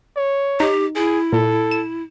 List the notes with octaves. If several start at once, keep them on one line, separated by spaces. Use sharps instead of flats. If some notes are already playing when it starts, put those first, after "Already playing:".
C#5
D#4 G4
E4 G#4
A#2 A4
E7